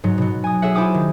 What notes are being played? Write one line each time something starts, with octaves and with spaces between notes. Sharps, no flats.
G#2 F#3
B2 F#3
G#5 D#6
G#4 C#5 E5 F#5
E4 F4 C5 G#5 D6 D#6
D#3